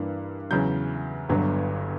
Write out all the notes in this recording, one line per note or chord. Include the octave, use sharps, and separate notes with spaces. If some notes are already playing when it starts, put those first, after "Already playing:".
Already playing: G2 E3 A#3 D4
E2 C#3 F#3 G6
G1 G2 F#3 B3 D4